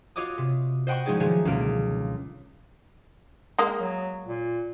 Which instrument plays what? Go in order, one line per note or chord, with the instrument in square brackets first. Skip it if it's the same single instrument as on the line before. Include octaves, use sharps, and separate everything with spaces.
[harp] F4 F#4 C#5 D#5 D6 D#6
C3
C5 D#5 F#5 G5 B5 C#6
F3 G#3 D#4 G#4 D5
D#3 F3 F#3 A3 G#4 C#5
C#2 B2 D3 A#3 F6 D7
[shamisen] G#3 A#3
[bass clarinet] F#3
A#2